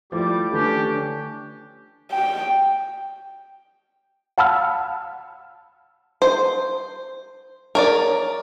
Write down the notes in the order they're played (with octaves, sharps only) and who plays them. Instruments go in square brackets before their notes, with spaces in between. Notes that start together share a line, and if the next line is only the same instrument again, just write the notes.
[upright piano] F3 A3 E4 [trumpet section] G3 D6
[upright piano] D3 A3 B4 [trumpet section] C#4 D4 G4
[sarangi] G5
[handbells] F5 F#5 A5 B5 E6 F6
[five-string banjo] C5
A#4 C#5 D5